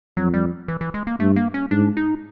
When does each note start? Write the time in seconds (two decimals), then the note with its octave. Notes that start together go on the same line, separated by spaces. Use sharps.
0.17 F2 F#3
0.34 G3
0.68 E3
0.81 E3
0.94 G#3
1.07 A#3
1.20 G2 A3
1.36 A#3
1.54 C#4
1.71 G#2 D4
1.97 D#4